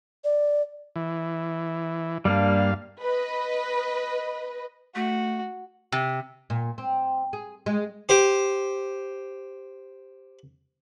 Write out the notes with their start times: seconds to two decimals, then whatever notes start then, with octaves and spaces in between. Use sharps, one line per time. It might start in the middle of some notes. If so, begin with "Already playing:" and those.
0.24 D5
0.96 E3
2.25 G2 G3 A#3 D4 F5
3.01 B4 D#5
4.95 A3 F#4
5.92 C3
6.50 A#2
6.78 C4
7.33 G#4
7.66 G#3
8.09 G4 C5